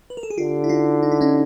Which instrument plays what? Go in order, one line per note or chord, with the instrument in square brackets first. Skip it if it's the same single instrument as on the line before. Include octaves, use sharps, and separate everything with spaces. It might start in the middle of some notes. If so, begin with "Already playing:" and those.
[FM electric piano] B4
A#4
A4
G#4
[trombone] D3 [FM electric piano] F4 G4
[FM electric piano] E4
D#4 F4
D#4
E4
C#4 D#4